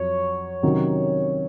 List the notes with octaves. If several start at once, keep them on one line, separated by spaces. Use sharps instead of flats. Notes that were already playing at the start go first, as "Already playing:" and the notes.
Already playing: F2 F#3 C#5
C3 D#3 F#3 C#4 F#4